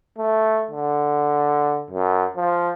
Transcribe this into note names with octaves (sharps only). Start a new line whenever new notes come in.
A3
D3
F#2
F3